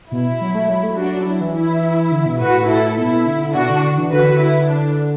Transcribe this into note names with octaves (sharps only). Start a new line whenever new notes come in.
B2 E4
F#3
A3
F#3
A3
F#3 D4 F#4
F#3
F#3 E4
E3
E4
D3
B2
A2 F#4 B4
E4 A4
B2 E4
D3
D3
B2 D4 F#4
D3
D3
E3
D3 F#4 B4
E4
D4